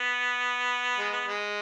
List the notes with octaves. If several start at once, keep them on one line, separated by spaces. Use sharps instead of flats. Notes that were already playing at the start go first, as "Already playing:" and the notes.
Already playing: B3
G#3
B3
G#3